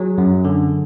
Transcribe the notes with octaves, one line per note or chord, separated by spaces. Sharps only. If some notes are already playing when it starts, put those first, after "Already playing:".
Already playing: F#3 G#4
F#2
D3